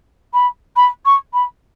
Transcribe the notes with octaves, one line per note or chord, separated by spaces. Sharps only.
B5
B5
C#6
B5